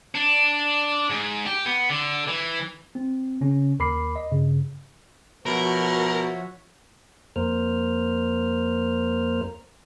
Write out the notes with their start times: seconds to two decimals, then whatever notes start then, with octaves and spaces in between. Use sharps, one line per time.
0.15 D4
1.10 G#2
1.46 G4
1.66 B3
1.90 D3
2.28 E3
2.95 C4
3.41 C#3 C#4
3.79 D#2 A#4 B5 D6 C7
4.16 D#5
4.31 G2 C#3
5.46 B2 F3 F#4 A#4 C#5 E5
7.36 F2 A#3 A#4 C5 F6